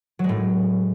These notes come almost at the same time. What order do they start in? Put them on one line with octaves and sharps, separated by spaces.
F#3 G#3 A2